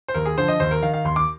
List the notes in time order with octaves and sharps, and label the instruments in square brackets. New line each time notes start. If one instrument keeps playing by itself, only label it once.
[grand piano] C5
D#2 A#4
G#4
D3 F3 C5
D#5
D#2 C5
A#4
D#3 F5
F5
D#2 C6
D6